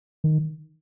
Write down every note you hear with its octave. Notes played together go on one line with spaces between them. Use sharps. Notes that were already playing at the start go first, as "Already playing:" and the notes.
D#3